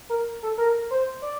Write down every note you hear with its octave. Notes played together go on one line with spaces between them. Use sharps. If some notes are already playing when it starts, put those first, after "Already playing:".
A#4
A4
A#4
C5
D5